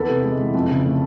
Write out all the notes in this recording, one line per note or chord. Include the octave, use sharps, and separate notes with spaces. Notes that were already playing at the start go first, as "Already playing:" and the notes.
Already playing: E2 A4 B4
C3
G#3
E3
F2
C#3
A3